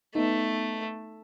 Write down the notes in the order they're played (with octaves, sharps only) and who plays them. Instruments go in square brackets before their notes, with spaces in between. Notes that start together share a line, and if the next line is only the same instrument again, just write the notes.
[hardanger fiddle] A3 [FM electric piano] B3 D#4